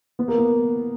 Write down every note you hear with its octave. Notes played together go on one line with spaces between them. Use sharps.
B3
A#3
B3